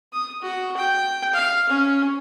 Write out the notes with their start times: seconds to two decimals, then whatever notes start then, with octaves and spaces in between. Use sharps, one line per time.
0.13 D#6
0.42 F#4
0.77 G5
1.33 F5
1.69 C#4